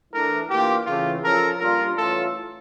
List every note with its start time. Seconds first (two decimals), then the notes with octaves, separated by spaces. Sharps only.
0.13 E3 A3 D4 A4 A#4
0.50 E3 A#3 D4 F4 G4
0.86 C#3 E3 A3 F4
1.23 F3 C#4 F4 A4 A#4
1.60 A#2 G3 D4 F4 A#4
1.97 A2 E3 A3 C#4 F4 A4